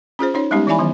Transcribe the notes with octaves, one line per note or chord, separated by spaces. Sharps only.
C#4 F4 G#4 C5
C#4 D#4 C#5
G3 G#3 B3 C#4 D#4 G4
E3 E4 D5 E5 G#5 B5
D#3 F#3 B3